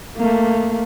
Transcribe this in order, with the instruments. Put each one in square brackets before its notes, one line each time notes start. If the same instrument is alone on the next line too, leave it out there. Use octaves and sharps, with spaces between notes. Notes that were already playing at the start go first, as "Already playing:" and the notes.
[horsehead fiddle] A3 A#3